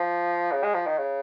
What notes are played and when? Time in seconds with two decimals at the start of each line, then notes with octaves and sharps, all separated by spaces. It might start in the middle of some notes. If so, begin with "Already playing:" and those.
Already playing: F3
0.52 C#3
0.64 G#3
0.74 F3
0.86 D#3
0.98 C#3